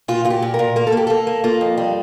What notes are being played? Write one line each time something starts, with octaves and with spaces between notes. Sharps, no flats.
A#2 F4
A#2 F4
G4
A#2
A#4
A#2
A#3 A#4
A4
A#3 G4
A#3 A4
A#3
A#3 F4
F2
G3